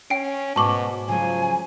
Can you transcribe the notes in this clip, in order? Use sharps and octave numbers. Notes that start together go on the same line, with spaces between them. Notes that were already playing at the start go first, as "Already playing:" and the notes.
C#4 G5 D7
G#2 B2 A5 C#6 D6
C#3 F3 F#3 G#3 G#5